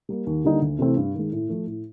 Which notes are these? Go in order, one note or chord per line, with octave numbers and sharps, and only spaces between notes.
G3 A#3
D#2
D3 G3 A#3 D#4
D2
C3 E3 A3 C4
G2
D#3 G#3
A2
F3 A3
A2